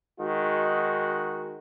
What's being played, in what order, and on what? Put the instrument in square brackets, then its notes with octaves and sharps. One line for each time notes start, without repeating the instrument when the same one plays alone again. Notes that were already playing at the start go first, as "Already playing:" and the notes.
[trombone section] D#3 G#3 D#4 F#4